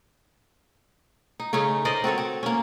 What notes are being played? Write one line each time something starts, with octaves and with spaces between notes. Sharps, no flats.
D#4
C#3 A3 C#4 D#4
A#4 C5 D5 D#5
C4 F#4 A4 C#5
C4
A#3 C#4